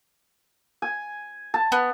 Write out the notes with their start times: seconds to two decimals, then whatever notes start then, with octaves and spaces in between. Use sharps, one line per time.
0.82 G#5
1.54 A5
1.72 B3